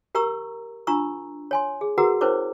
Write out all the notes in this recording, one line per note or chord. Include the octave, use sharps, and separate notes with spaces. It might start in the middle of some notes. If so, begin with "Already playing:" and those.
G4 A#4 A#5 C#6 E6
D4 F4 A#5 C#6 E6
C#5 G#5 C6
G#4
F#4 G#4 A#4 B4 F#5 A#5
C#4 E4 A#4 C5 C#5 D6